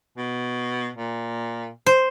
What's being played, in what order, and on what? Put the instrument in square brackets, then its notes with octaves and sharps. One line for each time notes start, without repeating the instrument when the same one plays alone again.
[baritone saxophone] B2
A#2
[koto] C5